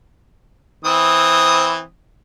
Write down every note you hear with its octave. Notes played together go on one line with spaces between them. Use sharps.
E3 C4 D#6